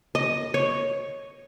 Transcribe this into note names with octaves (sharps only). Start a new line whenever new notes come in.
D#5
C#5